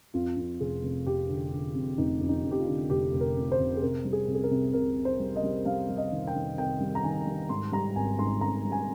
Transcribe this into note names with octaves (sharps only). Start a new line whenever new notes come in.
F2 F4
F2
F1 G#4
F1
F1 G4
D3
D3
F2
F1 D#4
F2
D#4
F2
G4
F4
D3
F1 G4
F1
A#4
F2
C5
F1
G#4
C3 A#4
G3
G#4
C2
G#4
A#4
C3
C2 A#4
C2
C5
G3
D#5
G3
G3 F5
G3
D#5
D#3
G5
D#3
C2 G5
G3
A#5
D#3 G#5
G3
G#2 C6
G3 A#5
G#1 G#5
G#2 C6
G#1 A#5
G3
G#5